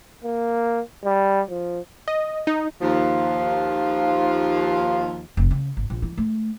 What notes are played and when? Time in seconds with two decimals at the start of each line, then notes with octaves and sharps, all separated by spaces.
0.24 A#3
1.05 G3
1.49 F3
2.08 D#5
2.47 D#4
2.81 D#2 F3
5.37 F1
5.51 C#3
5.77 G#1
5.90 A#1
6.02 E3
6.18 A3